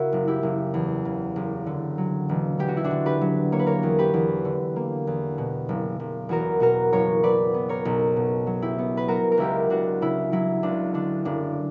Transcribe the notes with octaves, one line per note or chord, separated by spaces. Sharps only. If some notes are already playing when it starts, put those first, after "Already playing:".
Already playing: C#3 E4 F#4 A#4
F#1
E4 G4
F#1
E2
C#3
F#1
D3
F#3
E1
E2 G4
F#4
E4
D4 F#4
D3
G4 B4
F#3
A#3 C#5
B4
A#4 C#5
E2
G4 B4
E2
D3
A#3
E2
B2
F#1
F#1
E2 F#4 A#4
B2 F#4 A#4
F#1 A#4 C#5
F#3 B4 D5
B3
A#4 C#5
B1
B2
F#3
E4 G4
B3
B4
F#3 F#4 A#4
A#4
C#2 E4 G4
C#2 D4 F#4
C#3 E4
F#3 E4
C#2 D4
D3 D4
F#1 D4